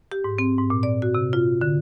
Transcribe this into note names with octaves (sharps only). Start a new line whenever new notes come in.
G4
G#2
C4
G#2
A#2
D5
F#4
C3
F4
D3